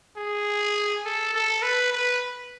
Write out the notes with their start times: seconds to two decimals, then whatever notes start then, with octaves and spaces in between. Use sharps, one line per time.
0.17 G#4
1.05 A4
1.34 A4
1.63 B4
1.92 B4